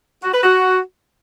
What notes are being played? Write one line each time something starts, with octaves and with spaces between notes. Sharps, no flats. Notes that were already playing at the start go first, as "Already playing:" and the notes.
F#4
B4
F#4